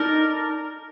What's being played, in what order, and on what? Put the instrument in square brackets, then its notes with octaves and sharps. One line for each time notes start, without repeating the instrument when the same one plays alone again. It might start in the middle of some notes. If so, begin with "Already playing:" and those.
Already playing: [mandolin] D#4 A4 D5 [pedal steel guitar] A#4